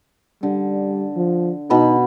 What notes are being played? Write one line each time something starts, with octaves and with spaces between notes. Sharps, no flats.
D3 G3
F3
B2 D#4 B5